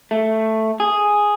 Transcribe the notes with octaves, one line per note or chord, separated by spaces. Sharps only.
A3
G#4